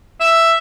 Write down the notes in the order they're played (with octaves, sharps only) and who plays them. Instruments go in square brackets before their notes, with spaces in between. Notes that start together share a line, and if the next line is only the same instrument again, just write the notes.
[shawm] E5